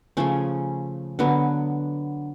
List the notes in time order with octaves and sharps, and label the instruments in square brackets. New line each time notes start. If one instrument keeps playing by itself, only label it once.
[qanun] C#3 F3 A3 C#4
D3 F#3 B3